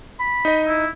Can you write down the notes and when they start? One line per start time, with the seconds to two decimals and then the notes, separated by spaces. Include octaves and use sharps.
0.20 B5
0.45 D#4 D#5
0.68 E4